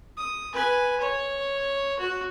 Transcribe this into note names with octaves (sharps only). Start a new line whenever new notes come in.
D#6
B4 G#5
C#5
F#4